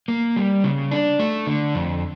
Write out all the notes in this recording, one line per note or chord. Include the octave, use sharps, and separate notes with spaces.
A#3
G3
C#3
D4
A3
D3
F2